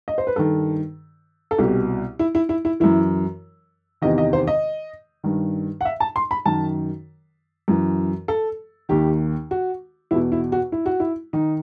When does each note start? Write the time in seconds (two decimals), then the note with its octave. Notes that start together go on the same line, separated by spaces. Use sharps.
0.08 D#5
0.18 C5
0.27 B4
0.36 G2 D#3 A4
1.51 A4
1.58 C2 B2 G4
2.19 E4
2.35 E4
2.49 E4
2.65 E4
2.80 F#2 E3 E4
4.02 E2 C3 D#3 D#5
4.18 D#5
4.33 C5
4.48 D#5
5.24 G2 D#3
5.81 F#5
5.85 E5
6.00 A5
6.16 C6
6.31 B5
6.46 F#2 D#3 A5
7.68 F#2 E3
8.28 A4
8.89 D#2 D#3 G4
9.51 F#4
10.11 E2 B2 E4
10.32 E4
10.52 F#4
10.72 E4
10.86 F#4
11.00 E4
11.33 D#3 D#4